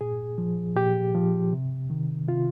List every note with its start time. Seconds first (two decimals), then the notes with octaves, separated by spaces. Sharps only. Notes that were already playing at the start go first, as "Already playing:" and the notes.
0.01 A#2 G#4
0.38 F3
0.76 A#2 G4
1.14 F3
1.53 C3
1.90 D#3
2.28 C3 F4